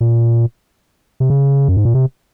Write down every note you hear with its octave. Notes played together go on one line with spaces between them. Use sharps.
A#2
C3
C#3
F#2
G#2
A#2
C3